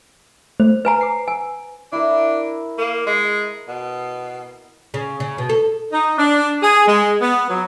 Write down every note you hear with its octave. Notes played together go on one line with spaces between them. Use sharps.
A3 C5
B4 G#5 A#5
D6 C7
G#5 E6
D4 E4 A#4
A#3
G#3
B2
C#3
C#3
B2
A4
D#4
D4
G#4
G#3
B3
F#3